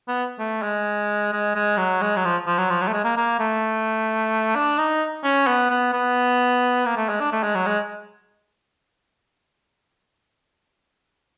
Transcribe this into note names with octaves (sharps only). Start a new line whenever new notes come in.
B3
A3
G#3
G#3
G#3
F#3
G#3
F#3
F3
F3
F#3
F3
F#3
A3
G#3
A#3
A#3
A3
D4
D#4
C#4
B3
B3
B3
A#3
A3
G#3
D4
A3
G#3
F#3
G#3